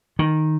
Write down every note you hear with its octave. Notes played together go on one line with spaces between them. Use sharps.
D#3